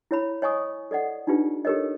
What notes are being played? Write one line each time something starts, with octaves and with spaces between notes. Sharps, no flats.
E4 C#5 B5
C#5 D#5 G#5 C#6 D#6
A4 D5 D#5 F#5
D4 D#4 F4 G4 B4
G4 A4 A#4 C#5 D#5